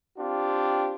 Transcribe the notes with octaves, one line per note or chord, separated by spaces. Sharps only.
C4 D4 F4 G4